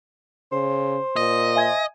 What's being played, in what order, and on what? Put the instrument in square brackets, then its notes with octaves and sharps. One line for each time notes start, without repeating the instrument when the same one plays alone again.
[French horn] C#3 [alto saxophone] C5
[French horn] A#2 [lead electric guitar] D#5
[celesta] E5 G#5 G#6